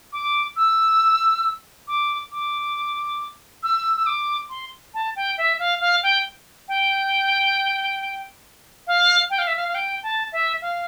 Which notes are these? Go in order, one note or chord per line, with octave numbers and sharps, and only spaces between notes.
D6
E6
D6
D6
E6
E6
D6
C6
A5
G5
E5
F5
F5
G5
G5
F5
G5
F5
E5
F5
F5
G5
A5
E5
F5